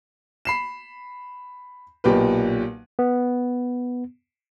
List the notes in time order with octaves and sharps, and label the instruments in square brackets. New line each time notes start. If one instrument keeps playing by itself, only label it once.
[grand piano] B5 C7 E7
B1 A#2 G4 B4
[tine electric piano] B3